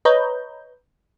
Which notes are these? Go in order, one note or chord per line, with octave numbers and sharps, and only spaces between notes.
B4 C#5 D#5 A#5 G6